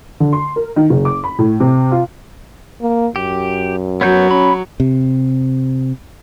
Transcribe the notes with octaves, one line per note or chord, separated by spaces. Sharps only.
D3
C6
A#4
D#3
F#1
D6
B5
A2
C3
F4
A#3
F#2 G4
F#3 B3 C#5 G6
C#4 B5
C3